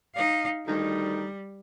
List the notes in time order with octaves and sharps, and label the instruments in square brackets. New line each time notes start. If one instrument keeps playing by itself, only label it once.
[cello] D#4 F5
[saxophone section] D2 D#3 D#4 [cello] G3